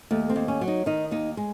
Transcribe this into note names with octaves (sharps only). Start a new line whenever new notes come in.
D#2 A3
C4
D#2
C#4
F#3
D#4
D#3 D#4
D#2 D#4
G#3